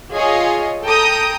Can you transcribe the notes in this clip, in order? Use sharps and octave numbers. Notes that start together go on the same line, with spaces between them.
F4 G#4 C#5 D#5
A4 G5 A#5 D#6 G6